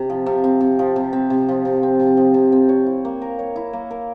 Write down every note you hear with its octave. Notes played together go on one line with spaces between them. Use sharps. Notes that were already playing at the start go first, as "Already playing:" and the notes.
Already playing: C3
F3
C3
C4
C3
F3
C3
C4
C3
F3
C3
C4
C3
F3
C3
C4
C#5
E4
A#3
A#4
C#5
E4
A#3
A#4